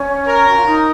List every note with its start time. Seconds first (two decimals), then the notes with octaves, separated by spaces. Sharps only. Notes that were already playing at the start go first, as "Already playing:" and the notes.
Already playing: C#4
0.27 A#4
0.48 F#4
0.56 F4
0.65 D#4